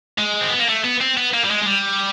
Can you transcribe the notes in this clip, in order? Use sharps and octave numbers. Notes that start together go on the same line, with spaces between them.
G#3
C4
B3
A#3
A3
B3
C4
B3
A#3
G3
G#3
G#3
G3